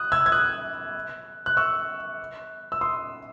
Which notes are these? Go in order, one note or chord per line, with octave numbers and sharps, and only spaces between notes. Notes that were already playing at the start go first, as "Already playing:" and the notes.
Already playing: D#6 F#6
E6 G#6
G#6
D#6 F#6
F#6
C#6 E6
E6
C6 D#6